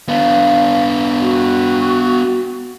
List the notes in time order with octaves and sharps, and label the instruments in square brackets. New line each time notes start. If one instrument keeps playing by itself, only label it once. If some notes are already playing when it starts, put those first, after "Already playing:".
[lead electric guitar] B3 D4 [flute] F5
[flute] F#4